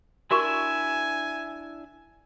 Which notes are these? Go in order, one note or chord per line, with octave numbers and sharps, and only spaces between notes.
D4 E4 F#4 A#4 E5 G#5 C#6